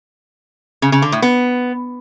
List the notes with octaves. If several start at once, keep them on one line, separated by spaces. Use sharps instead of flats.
C#3
C#3
D3
A2
B3